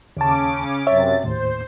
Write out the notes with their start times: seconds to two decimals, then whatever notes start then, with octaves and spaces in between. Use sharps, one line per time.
0.17 D#2 C#3 C#4 A5 D6
0.87 F#2 C3 C#5 E5 A6
1.24 D#2 A2 C5